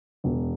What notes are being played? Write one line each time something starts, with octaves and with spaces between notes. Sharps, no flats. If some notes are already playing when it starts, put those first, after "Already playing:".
E1